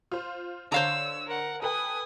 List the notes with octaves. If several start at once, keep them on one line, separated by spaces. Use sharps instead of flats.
F4 C5
D3 C5 C#5 F5 A#5 E6
A#4 F#5
A4 B4 G5 G#5 D#6